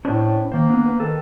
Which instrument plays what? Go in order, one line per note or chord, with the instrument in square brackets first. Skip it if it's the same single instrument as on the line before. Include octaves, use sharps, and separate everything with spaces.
[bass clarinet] A2 [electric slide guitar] C#4 D4 C5
[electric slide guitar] D#3 C5 [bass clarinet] A#3
[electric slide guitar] B3 D4
B4
[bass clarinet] D#3 [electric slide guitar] A4 B4